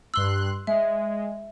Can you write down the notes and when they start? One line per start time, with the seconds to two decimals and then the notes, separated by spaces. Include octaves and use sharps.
0.14 G2 C6 E6 F#6 G7
0.67 G#3 E5